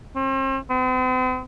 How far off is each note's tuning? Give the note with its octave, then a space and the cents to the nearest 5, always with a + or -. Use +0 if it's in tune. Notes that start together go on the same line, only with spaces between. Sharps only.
C4 +40
C4 -45